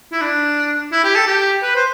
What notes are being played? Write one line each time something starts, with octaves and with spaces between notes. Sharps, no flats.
E4
D4
E4
G4
A4
G4
B4
C5